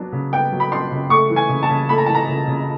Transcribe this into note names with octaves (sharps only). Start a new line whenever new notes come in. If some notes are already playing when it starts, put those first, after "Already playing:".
Already playing: F#3 B3 D4
C#3
B3 G5
F#3
B5
D4 C6
C#3
A3 C#6
E3
G#5
C#3
A5
C#3
A3 B5
A#5
E3 A5
A#5
C#3
C#3